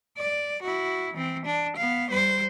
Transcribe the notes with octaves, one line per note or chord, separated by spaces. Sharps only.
D5
E4 F#4
E3 C4
D4
B3 F5
G3 C5